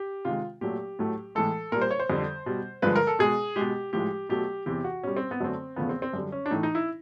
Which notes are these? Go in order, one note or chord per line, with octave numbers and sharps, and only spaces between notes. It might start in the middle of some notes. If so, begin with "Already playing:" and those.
Already playing: G4
C3 D#3 G#3 F4
A#2 F#3 A3 G4
A2 F#3 A3
A2 E3 G#3 A4
A#2 G3 A#4
C5
C#5
C5
F2 D3 G3
B2 G3
G2 D3 F3 G#3 B4
A#4
A4
B2 G#3 G#4
B2 G#3 G4
A2 F3 G#3 G4
B2 F#3 A3 G4
E2 C3 E3 G4
F#4
B2 G3 C#4
C4
B3
F#2 D3 F#3 A3 C4
E2 C#3 F3 A3 B3
C4
C4
F#2 D3 G3
C#4
D4
A2 E3 A3 D#4
D#4
E4